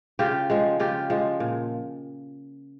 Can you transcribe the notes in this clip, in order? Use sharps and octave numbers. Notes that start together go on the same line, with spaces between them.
C#3 F4 G4
F3 G#3
C#3 F4 G4
F3 G#3
A#2